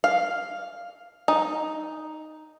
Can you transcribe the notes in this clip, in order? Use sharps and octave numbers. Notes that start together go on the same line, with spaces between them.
F5
D#4